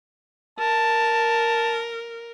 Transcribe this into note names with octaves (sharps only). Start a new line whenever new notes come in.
A#4 A5